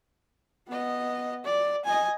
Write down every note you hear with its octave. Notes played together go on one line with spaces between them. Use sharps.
B3 D#5
D5
D#5 G#5